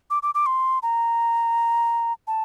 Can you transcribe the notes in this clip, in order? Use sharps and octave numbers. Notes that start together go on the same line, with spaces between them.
D6
D6
D6
C6
A#5
A5